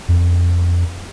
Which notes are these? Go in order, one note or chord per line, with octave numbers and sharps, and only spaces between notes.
F2